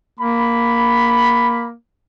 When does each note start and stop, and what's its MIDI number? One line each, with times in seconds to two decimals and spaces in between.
0.20 1.73 58
0.20 1.65 83